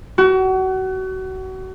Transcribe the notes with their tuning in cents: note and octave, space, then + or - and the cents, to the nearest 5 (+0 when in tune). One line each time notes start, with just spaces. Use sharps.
F#4 +30